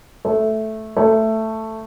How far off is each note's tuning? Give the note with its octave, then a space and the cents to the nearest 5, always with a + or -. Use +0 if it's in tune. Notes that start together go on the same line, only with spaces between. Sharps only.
A3 -5
A3 +10